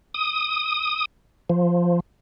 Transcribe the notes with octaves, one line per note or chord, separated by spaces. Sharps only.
D#6
F3